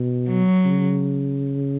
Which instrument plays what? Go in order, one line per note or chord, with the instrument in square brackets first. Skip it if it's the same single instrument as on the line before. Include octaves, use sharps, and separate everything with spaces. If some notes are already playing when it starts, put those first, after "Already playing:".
Already playing: [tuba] B2
[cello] F#3
[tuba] C#3